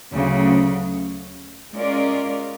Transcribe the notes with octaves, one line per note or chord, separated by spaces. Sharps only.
D2 C#3 F#3
G#3 C#4 F4 A#4 D5